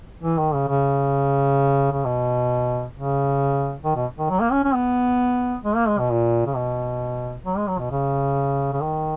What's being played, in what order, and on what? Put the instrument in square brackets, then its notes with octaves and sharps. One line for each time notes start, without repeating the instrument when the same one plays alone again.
[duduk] E3
D#3
C#3
C#3
C#3
B2
C#3
D#3
B2
D#3
F#3
A#3
C#4
C#4
B3
G#3
A#3
G#3
B2
A#2
C#3
B2
F#3
G#3
F#3
B2
C#3
C#3
D#3